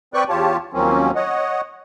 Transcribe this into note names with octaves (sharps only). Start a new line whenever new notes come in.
C4 B4 D5 G5 C#6 F#6
E2 F4 G4 C#5 A5
D#2 F3 F#3 A#3 C4 C#4
C#5 D#5 F#5